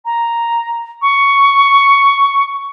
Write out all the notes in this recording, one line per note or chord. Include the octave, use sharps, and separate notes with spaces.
A#5
C#6